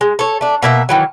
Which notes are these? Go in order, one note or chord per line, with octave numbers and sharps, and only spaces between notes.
G#3
A4 C#5
A3 D4
B2 A#3 E5
D#3 E3 F#3